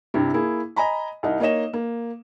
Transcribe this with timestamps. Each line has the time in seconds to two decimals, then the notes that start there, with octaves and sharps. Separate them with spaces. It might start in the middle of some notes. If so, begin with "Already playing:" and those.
0.14 G2 C3 E4
0.34 A#3 E4 G#4
0.76 D#5 G#5 A#5 B5
1.23 C2 D#4
1.40 A#3 D#4 C#5 D#5 E7
1.73 A#3